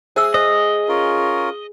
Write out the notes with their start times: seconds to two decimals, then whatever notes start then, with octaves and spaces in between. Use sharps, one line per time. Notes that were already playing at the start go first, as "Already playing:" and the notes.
0.16 G#4 C5 E5 E6
0.34 C5 D#5
0.89 C#4 F4 A#4